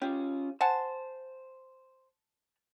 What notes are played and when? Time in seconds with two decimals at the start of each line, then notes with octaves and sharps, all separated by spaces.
0.02 C#4 F4 G4
0.61 C5 F#5 G#5 A5